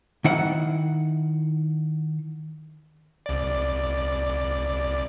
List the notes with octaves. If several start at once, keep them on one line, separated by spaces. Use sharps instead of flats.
D#3 E4 F#5
C2 D5